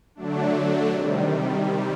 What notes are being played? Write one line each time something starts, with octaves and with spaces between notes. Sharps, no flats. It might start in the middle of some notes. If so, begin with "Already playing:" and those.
D3 F#3 A3 D4
C3 D#3 G3